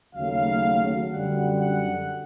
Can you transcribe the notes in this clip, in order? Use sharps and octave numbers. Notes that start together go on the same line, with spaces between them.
D#2 C#3 F#3 A3 F5
F#2 D3 G3 F#5
F#5